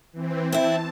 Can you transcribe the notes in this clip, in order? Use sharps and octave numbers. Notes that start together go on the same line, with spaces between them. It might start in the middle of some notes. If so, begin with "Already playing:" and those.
E3 C4
C4 E4 A5